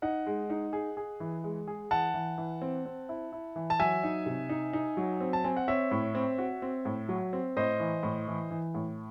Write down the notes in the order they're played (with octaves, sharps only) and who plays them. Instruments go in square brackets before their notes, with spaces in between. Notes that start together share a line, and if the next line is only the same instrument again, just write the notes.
[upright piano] D#4 [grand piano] D#5 F#5
[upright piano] G#3
D#4
G#4
G#4
E3
G#3
G#4
[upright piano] E3 [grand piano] F#5 A5
[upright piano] E3
E3
C4
C4
E4
E4
E3
[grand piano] A5
[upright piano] F#3 [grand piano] E5 G#5
[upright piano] D#4
C3
D#4
D#4
F#3
C4
[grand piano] A5
[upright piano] C4 [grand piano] G#5
[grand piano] F#5
[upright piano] C4 [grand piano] C#5 E5
[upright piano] A2
C4
F#4
C4
A2
F#3
C4
[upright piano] A2 [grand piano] C5 D#5
[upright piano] E3
A2
E3
E3
A2